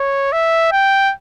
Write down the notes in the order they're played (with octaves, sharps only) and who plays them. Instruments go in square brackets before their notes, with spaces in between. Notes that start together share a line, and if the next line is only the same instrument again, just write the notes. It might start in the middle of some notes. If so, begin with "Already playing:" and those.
Already playing: [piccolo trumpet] C#5
E5
G5